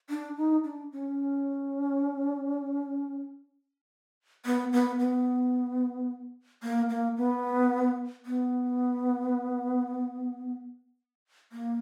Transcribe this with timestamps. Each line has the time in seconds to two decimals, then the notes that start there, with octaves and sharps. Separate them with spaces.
0.10 D4
0.37 D#4
0.64 D4
0.92 C#4
4.45 B3
4.73 B3
4.99 B3
6.63 A#3
6.89 A#3
7.17 B3
8.26 B3
11.52 A#3